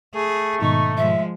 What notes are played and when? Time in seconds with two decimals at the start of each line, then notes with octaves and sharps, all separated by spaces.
0.15 A3 G#4
0.62 G#2 B2 D#3 D#4 C#6
0.97 F3 G#3 E5